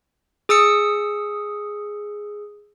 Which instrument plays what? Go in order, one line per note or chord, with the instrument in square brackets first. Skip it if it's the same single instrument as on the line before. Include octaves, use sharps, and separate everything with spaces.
[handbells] G#4 D#6 E6 C#7